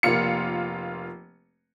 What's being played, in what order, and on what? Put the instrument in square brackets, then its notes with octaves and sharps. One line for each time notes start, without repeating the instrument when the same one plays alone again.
[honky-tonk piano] F1 A#3 F4 C#7